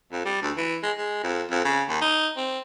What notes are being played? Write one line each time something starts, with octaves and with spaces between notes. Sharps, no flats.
F2
G3
D2
E3
G#3
G#3
F2
F2
C#3
D#2
D#4
C4